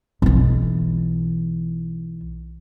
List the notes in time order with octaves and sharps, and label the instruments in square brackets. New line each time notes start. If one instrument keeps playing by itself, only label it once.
[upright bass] B1 E3